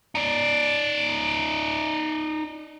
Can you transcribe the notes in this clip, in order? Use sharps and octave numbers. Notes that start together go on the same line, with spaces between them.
D#4 D5